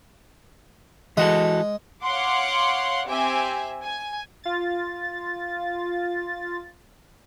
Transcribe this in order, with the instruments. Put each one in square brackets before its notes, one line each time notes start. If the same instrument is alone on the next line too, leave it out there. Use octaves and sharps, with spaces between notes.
[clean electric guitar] E3 F#4 A4 [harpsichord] G#3
[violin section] C#5 F5 F#5 C6 D6
C4 G4 E5 G#5
G#5
[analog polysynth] F4 A6